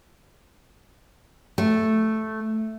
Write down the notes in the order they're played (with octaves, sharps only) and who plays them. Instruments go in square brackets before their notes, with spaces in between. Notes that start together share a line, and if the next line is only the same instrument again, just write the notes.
[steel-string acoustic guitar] A3